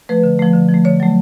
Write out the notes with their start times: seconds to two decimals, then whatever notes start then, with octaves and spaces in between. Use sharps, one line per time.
0.09 F3 A3 B4
0.24 D3
0.39 F3 A3
0.54 D3
0.69 F3
0.74 A3
0.85 D3 C#5
1.00 F#3 A3